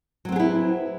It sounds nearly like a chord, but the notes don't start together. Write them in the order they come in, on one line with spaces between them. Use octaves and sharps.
F#3 C4 B3 G#4 E4